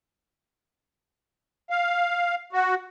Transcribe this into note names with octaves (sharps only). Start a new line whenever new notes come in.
F5
F#4